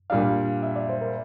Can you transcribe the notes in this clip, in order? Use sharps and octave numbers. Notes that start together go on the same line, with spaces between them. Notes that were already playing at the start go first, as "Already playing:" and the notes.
A#2 G3 D4 F5
E5
D5
C5
A#4